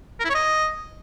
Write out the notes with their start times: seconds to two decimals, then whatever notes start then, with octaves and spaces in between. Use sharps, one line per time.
0.20 A#4
0.25 E4
0.30 C#5
0.35 D#5